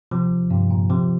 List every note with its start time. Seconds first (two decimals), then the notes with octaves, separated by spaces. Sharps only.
0.11 C3 F3
0.50 G2 C3
0.70 A#2
0.89 C3 F3